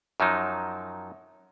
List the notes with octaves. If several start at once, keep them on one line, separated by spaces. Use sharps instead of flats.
F#2 F3 F#3 D#4